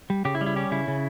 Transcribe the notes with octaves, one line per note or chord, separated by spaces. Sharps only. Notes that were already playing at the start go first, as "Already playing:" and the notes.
G3
C#3 G4
E4
G3
E4
C#4 G4
C#3 E4
C#3